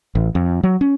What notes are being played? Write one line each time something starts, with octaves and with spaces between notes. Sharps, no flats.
A1
F2
F#3
C#4